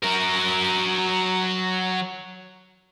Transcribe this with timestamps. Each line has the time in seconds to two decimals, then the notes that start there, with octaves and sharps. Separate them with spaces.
0.03 F#3 A#4